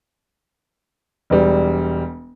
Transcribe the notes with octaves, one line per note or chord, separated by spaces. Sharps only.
E1 G3